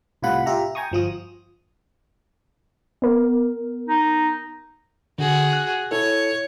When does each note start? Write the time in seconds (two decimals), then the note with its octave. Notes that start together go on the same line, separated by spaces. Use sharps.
0.22 C2 A2 C3 F4 F#5 B5
0.46 F4 G4 E5 A#5
0.75 G5 G#5 A#5 C#6 D#6
0.92 G1 F3 F4 D#6
3.02 B3 A#4
3.89 D#4
5.18 D3 F#4 G#4
5.53 F#6
5.91 E4 A4 C#5